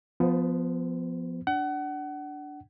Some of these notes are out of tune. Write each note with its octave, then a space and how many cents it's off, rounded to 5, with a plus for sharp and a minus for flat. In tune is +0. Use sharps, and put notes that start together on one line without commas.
F3 +5 B3 +10 C5 -25
D4 -5 F#5 +30